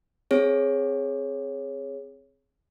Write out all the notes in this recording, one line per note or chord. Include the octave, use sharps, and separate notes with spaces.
C4 G#4 C#5